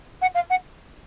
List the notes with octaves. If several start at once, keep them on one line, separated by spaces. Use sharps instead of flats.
F#5
F5
F#5